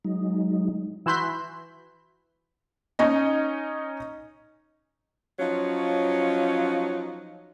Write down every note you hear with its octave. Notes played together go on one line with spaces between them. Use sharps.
F#3 G#3 D#4
E3 E4 F#4 C6 G6 B6
C#4 D#4 D#5
F3 F#3 C#4 D#4